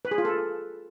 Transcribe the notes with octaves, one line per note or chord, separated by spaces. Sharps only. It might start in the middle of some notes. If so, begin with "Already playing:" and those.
B4
G#4
F4
A4